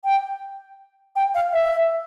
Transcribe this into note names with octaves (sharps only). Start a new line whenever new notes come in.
G5
G5
F5
E5